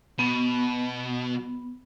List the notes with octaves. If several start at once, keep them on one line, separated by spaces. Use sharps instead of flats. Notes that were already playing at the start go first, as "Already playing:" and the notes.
B2 B3